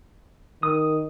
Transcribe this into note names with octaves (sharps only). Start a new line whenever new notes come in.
D#3 D#6